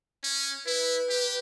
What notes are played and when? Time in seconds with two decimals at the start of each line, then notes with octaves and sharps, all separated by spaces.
0.23 C#4
0.66 E4 B4
1.09 G4